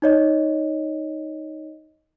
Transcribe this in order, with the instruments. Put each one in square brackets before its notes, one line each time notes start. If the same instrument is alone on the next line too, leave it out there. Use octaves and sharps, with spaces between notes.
[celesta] D#4 C#5 D#5